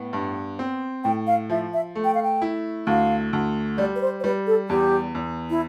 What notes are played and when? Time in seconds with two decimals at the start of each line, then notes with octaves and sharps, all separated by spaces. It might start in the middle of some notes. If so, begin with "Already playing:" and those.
Already playing: A2 B3
0.13 G2
0.59 C4
1.04 A2 G5
1.27 F5
1.50 F3 E5
1.73 E5
1.95 A3
2.04 G5
2.15 F5
2.23 G5
2.42 E4
2.87 D2 F5
3.33 D2
3.78 G3 D5
3.95 B4
4.02 C5
4.20 C5
4.24 G3 B4
4.47 A4
4.69 E2 G4
5.15 E2
5.50 E4